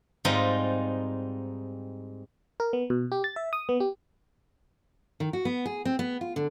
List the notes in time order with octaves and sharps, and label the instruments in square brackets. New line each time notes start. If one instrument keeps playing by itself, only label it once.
[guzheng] G#2 G3 C4 D#4 F4
[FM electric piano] A#4
B3
B2
G4
A6
E5
D#6
B3
G4
[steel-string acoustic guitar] D#3
F#4
B3
G#4
C4
B3
F4
D3